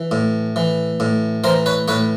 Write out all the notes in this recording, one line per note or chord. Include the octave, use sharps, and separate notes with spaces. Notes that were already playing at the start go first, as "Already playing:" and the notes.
Already playing: E3
A2
E3
A2
E3 A#4 C5
B4 C#5
A2 B4 C#5